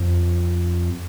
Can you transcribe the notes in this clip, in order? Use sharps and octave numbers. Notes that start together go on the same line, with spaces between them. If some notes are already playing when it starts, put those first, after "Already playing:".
Already playing: F2